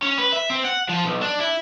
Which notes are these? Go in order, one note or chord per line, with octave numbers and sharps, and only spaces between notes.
C#4
B4
E5
C4
F#5
F3
B1
D4
E4